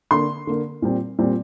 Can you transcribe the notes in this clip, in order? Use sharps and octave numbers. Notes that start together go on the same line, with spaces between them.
D3 A#3 C6
D3 A#3
A#2 G3 C4
A#2 G3 C4